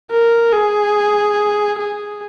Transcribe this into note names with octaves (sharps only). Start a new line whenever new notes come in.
A#4
G#4
G#4